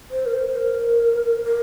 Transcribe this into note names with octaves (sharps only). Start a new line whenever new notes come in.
C5
A#4
C5
A#4
A#4